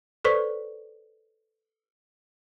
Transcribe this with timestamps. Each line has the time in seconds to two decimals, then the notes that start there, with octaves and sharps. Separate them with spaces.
0.24 A4 B4 C5 D5 C#6 B6